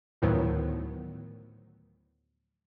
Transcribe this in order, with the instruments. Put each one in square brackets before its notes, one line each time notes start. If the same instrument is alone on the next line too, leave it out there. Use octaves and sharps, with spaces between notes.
[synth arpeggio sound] D2 A2 D#3 F3 F#3 B3